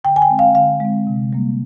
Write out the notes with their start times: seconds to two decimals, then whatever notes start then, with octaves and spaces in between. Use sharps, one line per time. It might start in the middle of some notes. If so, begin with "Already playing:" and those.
0.04 D3 G5
0.16 G#5
0.22 G5
0.30 G#3 C4
0.39 F5
0.55 D3 F5
0.80 G#3 C4
1.07 C3
1.33 G3 A#3